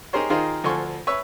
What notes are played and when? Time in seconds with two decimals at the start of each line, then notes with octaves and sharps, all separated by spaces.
0.13 D#4 G4 G#4 A#4 C5 C#5
0.30 D#3 D#4 F4 G#4 A#4 C5
0.64 D2 F3 A4 G#5 C6 C#6
1.07 B4 C#5 E5 C#6 E6